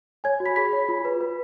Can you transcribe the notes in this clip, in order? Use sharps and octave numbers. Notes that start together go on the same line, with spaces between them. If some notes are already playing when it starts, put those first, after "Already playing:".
C#5 G#5 G#6
F#4
B5 B6
G#4 B5 B6
C#5
F4
B4
B4